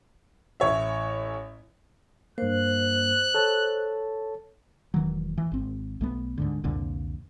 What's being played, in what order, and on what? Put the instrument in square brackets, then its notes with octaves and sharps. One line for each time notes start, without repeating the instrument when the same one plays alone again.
[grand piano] A1 C#5 E5
[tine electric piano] G2 A#3 [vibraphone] C5 [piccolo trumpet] F#6
[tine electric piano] A4 C#5 A5
[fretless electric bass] E1 D#3 E3 F#3
E3
G#1 C4
B1 A3 B3
D2 G#2 D3
C2 F2 A#2 D3